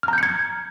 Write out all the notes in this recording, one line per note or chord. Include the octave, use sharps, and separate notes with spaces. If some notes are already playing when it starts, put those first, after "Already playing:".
A#5 F6 G6 G#6 C#7